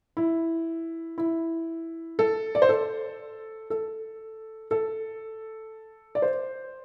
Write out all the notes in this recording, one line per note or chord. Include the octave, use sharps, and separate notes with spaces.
E4
E4
A4
D5
C5
A4
A4
A4
D5
C5